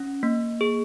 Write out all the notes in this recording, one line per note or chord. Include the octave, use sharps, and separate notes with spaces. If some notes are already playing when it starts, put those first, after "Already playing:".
Already playing: C#4
A#3
G#4